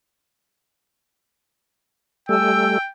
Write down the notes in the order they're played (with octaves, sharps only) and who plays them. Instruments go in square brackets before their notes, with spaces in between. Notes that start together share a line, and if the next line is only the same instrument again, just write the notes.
[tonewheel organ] G3 A3 [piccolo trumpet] G5 [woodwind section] G#5 E6